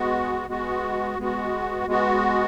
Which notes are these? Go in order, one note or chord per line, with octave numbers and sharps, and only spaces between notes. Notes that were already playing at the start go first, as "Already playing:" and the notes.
Already playing: G#3 B3 F#4
G#3 B3 F#4
G#3 B3 F#4
G#3 B3 F#4